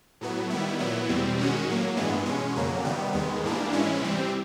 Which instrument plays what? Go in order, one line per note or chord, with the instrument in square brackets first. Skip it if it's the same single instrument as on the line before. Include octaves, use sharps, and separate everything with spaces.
[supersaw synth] A2 F#3 B3
D#3 G3 B3 E4
A#2 F#3 B3 E4
E2 B2 G3 C4
D#3 G#3 C#4 F#4
A2 F#3 A#3
G2 E3 G#3 B3
B2 G#3 C#4
F2 C#3 F#3 A#3
C3 D#3 G3 B3
D#2 D#3 G#3 B3
G#2 E3 G3 A#3 D4
G#2 E3 G#3 C#4 E4
C3 E3 G3 C4